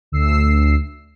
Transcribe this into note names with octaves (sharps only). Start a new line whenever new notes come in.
D2 E6 C7